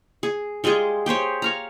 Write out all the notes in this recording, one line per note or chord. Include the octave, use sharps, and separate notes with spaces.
G#4
G3 G#3 F4 G#4
G4 G#4 C5 C#5
C#5 F5 A#5